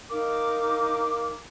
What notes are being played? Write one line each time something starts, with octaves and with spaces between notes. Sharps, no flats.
D#4 A#4 F5 D6